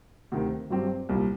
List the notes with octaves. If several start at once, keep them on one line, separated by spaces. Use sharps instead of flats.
D2 C3 D#3
G2 F#3 C4 G4
C2 A#2 G3